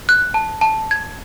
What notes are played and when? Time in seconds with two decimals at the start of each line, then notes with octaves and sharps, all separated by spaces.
0.09 F#6
0.34 A5
0.61 A5
0.91 G#6